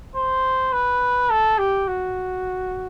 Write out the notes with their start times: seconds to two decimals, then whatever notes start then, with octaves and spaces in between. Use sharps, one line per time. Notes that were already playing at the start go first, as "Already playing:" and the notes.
0.15 C5
0.73 B4
1.30 A4
1.58 G4
1.88 F#4